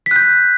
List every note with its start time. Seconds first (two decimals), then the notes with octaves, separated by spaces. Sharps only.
0.06 B6
0.11 F#6
0.16 G6